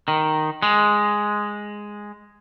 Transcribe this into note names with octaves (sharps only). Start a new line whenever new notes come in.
D#3
G#3